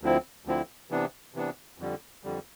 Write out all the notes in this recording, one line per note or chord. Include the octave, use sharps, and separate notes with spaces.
D2 D3 F3 C4 E4
D2 D3 F3 C4 E4
C3 E3 B3 D4
C3 E3 B3 D4
F2 D3 G3
F2 D3 G3